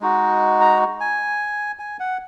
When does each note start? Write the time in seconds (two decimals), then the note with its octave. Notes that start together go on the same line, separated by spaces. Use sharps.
0.01 G#3 D#4 F#4
0.61 A#5
1.00 G#5
1.79 G#5
2.00 F#5